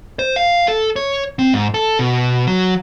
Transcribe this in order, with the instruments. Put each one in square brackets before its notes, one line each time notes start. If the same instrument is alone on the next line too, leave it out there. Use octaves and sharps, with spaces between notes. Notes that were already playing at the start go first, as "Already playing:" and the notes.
[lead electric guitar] C5
F5
A4
C#5
C4
G#2
A4
B2
F#3